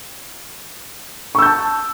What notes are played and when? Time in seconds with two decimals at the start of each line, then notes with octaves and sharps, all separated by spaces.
1.35 C#6
1.39 E6
1.42 G6
1.46 A5